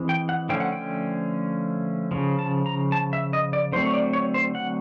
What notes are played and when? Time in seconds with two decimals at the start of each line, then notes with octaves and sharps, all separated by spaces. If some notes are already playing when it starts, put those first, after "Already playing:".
Already playing: E3 G#3 C4
0.09 G5
0.29 F#5
0.49 D3 F3 A3 C#4 G5
0.60 F#5
0.72 G5
2.11 C#3 F3
2.39 A5
2.66 A#5
2.92 A5
3.13 E5
3.33 D#5
3.53 D5
3.72 D3 F#3 A3 C4 C5
3.85 C#5
3.94 D5
4.13 C#5
4.34 C5
4.55 F#5